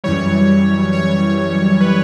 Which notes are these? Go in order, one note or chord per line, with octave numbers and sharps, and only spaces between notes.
F#2 E3 G3 C#5
C#5
B4